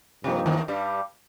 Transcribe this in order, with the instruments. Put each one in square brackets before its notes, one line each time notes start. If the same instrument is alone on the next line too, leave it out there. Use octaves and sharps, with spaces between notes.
[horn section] G2 F3 A#3 D#4 G4 [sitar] C3
[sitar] D#2 D#3
G2 G3